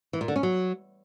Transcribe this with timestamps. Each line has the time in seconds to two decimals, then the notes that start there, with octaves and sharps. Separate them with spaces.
0.13 E3
0.21 A#2
0.28 D3
0.36 C#4
0.43 F#3